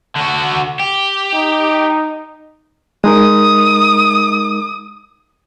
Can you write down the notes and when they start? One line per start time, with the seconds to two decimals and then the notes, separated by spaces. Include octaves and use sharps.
0.16 D3 F#4
0.80 G4
1.35 D#4
3.04 G#3 D#4 A#4 D#6